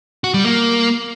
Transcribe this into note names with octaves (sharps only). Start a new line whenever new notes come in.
F#4
G3
A#3